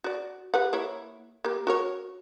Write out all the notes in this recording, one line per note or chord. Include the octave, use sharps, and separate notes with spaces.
F#4 D5
G4 B4 F#5
A#3 E4 C#5
A#3 G4
F#4 A#4 C#5